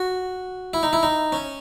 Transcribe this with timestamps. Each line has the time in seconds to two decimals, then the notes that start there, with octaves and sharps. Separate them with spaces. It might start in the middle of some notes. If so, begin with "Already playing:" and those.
Already playing: F#4
0.74 E4
0.83 D#4
0.93 E4
1.03 D#4
1.32 C#4